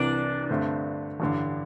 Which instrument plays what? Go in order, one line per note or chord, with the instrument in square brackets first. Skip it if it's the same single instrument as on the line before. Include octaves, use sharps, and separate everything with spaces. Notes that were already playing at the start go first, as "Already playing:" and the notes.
Already playing: [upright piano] C2 C3 E3 [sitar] D4
[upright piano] G2 D3 A3 C4
A1 G2 D3